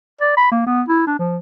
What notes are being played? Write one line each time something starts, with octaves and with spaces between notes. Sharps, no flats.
D5
B5
A#3
B3
E4
D4
F3